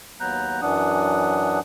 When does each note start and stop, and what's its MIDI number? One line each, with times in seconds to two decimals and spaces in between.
0.20 0.60 39
0.20 0.60 54
0.20 0.60 59
0.20 0.60 82
0.20 0.60 90
0.20 0.60 91
0.62 1.60 42
0.62 1.60 52
0.62 1.60 54
0.62 1.60 62
0.62 1.60 78
0.62 1.60 87